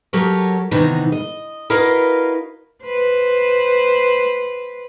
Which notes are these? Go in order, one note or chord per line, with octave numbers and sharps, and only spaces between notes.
F#3 G4 A4 A#4 C#5
C3 D#3 E3 B3 D#4
D#5
E4 F#4 A#4 B4 D#5 F5
B4 C5